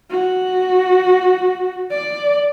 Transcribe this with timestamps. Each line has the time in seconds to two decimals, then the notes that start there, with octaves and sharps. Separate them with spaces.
0.10 F#4
1.91 D5